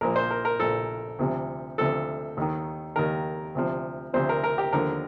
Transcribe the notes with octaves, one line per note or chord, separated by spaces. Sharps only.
A#1 A#2 F3 A#4
C5
A#4
A#4
A#1 A#2 F3 A4
D2 C3 F3
D2 C3 F3 A4
D#2 D#3
D#2 D#3 A#4
D2 C3 F3
D2 C3 F3 C5
A#4
A#4
G4
D#2 D3 F3 A#4